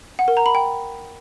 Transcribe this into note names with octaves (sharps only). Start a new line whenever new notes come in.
F#5
A#4
A#5
B5
G5